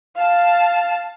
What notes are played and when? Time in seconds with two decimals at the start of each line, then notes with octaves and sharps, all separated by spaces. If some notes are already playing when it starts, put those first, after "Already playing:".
0.17 F5 A5